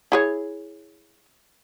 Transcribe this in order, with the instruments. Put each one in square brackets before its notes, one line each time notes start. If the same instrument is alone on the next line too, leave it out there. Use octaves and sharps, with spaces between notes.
[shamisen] E4 G#4 C#5